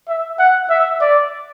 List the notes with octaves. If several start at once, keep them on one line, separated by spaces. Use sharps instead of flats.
E5
F#5
E5
D5